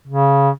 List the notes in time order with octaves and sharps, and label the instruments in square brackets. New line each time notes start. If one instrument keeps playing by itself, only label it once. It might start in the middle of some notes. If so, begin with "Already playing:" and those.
[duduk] C#3